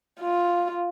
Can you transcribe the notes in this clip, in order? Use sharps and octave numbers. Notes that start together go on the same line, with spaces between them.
F4